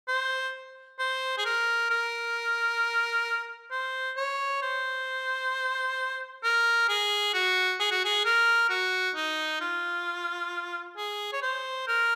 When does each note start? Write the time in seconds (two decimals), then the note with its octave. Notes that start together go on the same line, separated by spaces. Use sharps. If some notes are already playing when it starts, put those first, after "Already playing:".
0.08 C5
0.99 C5
1.38 G#4
1.45 A#4
1.90 A#4
3.71 C5
4.17 C#5
4.62 C5
6.44 A#4
6.89 G#4
7.34 F#4
7.80 G#4
7.91 F#4
8.05 G#4
8.25 A#4
8.70 F#4
9.16 D#4
9.61 F4
10.97 G#4
11.33 C#5
11.42 C5
11.88 A#4